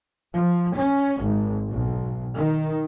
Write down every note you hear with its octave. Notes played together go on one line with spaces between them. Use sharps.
F3
C#4
G#1
B1
D#3